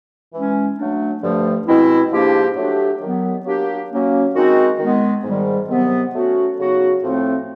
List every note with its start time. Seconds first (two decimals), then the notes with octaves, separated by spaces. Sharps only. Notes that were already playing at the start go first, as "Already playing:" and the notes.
0.33 E3 G#3 C#4
0.78 F#3 A3 D4
1.22 G2 D3 F3 A3
1.67 B2 G#3 C4 E4
2.12 G#2 F3 A#3 D4 G4
2.56 F#3 A3 D4 G4
3.01 D#3 F#3 B3
3.45 F#3 A#3 D4 G4
3.91 F#3 A#3 C#4
4.34 D#3 G#3 C4 D#4 F#4
4.79 D#3 G#3 B3
5.24 G#2 D#3 G3
5.68 C3 D#3 F#3 B3
6.13 F#3 A3 C#4 F#4
6.58 C#3 F#3 B3 D#4 F#4
7.03 A2 F3 A3 C4